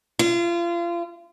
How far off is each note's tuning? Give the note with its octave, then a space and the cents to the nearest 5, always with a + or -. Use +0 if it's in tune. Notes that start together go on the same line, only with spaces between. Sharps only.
F4 -30